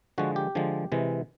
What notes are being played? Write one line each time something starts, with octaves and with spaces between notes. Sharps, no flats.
D3 F3 G#3 F#4
G4
D3 F3 G#3
C3 E3 G#3